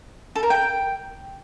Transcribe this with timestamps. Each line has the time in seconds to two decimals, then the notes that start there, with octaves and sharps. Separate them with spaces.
0.36 A4
0.43 A#4
0.50 G5